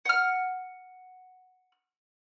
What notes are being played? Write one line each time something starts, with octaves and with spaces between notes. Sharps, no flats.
F#5 F6